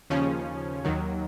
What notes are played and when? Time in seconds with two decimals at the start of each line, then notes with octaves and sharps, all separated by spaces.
0.10 D#2 C#3 F3 C#4
0.85 D#2 D#3 F#3